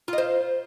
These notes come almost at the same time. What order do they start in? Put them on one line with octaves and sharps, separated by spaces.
F4 D#5 C5